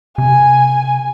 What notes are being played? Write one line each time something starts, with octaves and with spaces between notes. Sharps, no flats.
C3 G#5